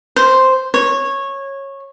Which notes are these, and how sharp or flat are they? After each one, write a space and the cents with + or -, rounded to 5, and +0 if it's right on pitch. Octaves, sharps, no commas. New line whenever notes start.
C5 +0
C#5 -15